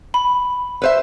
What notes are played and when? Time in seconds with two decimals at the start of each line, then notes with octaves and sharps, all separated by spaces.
0.14 B5
0.82 B4 C5 E5